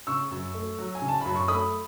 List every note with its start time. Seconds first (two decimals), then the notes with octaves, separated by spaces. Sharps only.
0.07 C#3 C#6 E6
0.31 F#2
0.54 A3
0.79 F#3
0.95 G#5
1.02 C#3
1.08 A5
1.21 F#2 B5
1.36 C#6
1.48 A3 B5 D#6